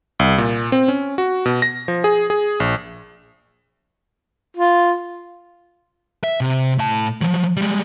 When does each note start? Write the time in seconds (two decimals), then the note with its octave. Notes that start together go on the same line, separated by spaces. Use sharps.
0.19 C2
0.38 A#2
0.72 C4
0.88 C#4
1.18 F#4
1.46 B2
1.62 A#6
1.88 F3
2.04 G#4
2.30 G#4
2.60 A#1
4.57 F4
6.24 E5
6.41 C3
6.78 A2 A5
7.21 F3 F#3
7.57 G3 G#3